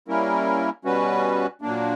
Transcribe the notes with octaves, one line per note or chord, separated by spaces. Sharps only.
G3 A#3 C#4 E4 A#4
B2 G3 C#4 F#4 B4
A#2 F#3 A#3 D4